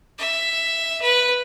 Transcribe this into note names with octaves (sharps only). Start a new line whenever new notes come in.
E5
B4